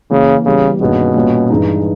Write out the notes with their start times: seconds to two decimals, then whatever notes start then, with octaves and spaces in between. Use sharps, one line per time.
0.11 C#3 E3 A#3 C#4
0.46 C#3 E3 G3 B3 G4
0.80 G2 B2 D#3 A#3 C#4 G#4
1.15 A#2 G3 C#4
1.50 G2 E3 G#3 D#4